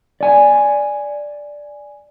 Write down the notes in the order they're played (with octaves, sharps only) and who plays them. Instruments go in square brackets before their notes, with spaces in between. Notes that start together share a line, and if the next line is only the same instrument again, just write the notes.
[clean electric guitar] D5 G#5